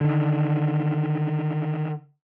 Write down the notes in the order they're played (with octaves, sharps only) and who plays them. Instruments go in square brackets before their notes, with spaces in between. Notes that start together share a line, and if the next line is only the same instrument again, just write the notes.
[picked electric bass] D3 D#3